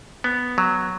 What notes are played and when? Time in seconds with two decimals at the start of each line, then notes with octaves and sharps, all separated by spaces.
0.24 B3
0.58 F#3